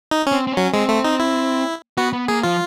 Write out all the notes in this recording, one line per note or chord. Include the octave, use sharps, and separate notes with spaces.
D#4
C#4
C4
C4
C#4
F#3
G#3 C4
A3
D#4
E4
B3 F#4
B3
A#3 G#4
F3 F4